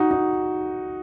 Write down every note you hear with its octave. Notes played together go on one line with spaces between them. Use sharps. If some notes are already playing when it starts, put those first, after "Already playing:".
Already playing: D#4 F#4
D#4